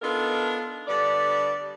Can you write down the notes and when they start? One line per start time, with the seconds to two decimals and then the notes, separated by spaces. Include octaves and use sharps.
0.02 B3 D4 D#4 F4 A4 A#4
0.88 D3 G3 B3 D5